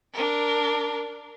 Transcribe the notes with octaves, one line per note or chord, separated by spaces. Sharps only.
D4 A#4